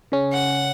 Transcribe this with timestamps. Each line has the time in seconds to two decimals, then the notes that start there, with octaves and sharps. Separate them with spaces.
0.12 C#3 C#4
0.33 F#5